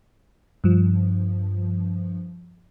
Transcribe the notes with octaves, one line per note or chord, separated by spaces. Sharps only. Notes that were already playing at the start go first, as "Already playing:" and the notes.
G2 F3